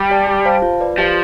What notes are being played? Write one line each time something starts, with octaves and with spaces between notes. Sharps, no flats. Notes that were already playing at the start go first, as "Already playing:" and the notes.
Already playing: G3
G4 D5 A5
G4
C5 F5 A5
F4
B4 D5
F3 G4